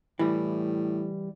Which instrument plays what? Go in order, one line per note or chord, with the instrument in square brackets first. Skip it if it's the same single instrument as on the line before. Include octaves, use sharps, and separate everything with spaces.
[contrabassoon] A2 [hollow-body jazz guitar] E3 G3